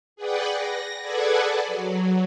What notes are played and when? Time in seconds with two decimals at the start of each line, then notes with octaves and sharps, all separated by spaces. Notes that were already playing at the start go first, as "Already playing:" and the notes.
0.16 G#4 B4 D5 F#5 G5
0.52 A#6
1.02 G#4 A4 B4 D5 F#5 G#5
1.66 F#3